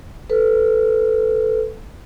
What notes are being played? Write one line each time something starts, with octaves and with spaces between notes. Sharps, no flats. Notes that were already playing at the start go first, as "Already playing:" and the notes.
A4 B4